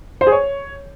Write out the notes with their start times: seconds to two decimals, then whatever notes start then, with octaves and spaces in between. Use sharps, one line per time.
0.21 C5
0.26 G#4
0.32 C#5